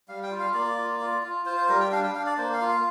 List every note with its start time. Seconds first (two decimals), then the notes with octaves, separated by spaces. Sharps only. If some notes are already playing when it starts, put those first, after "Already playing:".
0.08 G3 F5
0.23 G5
0.31 F4
0.39 F5
0.54 A#3 D5
0.78 F4
1.01 F4
1.23 F4
1.46 F4 C5
1.57 C5
1.69 G3 A#4
1.80 G5
1.92 D4 F5
2.04 G5
2.15 D4 F5
2.26 D5
2.37 A#3 C5
2.53 F5
2.61 F4
2.69 F5